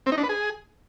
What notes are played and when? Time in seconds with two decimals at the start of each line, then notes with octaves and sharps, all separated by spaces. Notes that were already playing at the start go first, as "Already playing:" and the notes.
0.06 C4
0.12 D#4
0.18 D4
0.23 B4
0.29 G#4